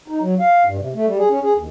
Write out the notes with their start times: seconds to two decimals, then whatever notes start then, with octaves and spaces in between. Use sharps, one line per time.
0.08 D#4
0.20 F#3
0.40 F5
0.65 G2
0.78 C3
0.95 A3
1.07 G3
1.18 G#4
1.30 C#4
1.42 G#4
1.55 D#2